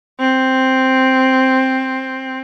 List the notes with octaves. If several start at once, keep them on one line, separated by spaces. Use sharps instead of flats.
C4